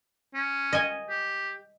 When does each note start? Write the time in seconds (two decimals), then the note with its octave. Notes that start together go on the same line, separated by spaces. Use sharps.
0.35 C#4
0.73 D#5 G#5
1.10 G4